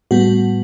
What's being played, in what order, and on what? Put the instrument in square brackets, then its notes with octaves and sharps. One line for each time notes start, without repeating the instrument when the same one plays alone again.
[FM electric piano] A2 G3 B3 F#4